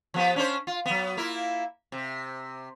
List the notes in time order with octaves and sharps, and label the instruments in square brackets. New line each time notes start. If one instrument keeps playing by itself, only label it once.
[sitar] F3 B3 G4
C#4 D4 C5
F4
F#3 B3
A#3 E4 F4
C3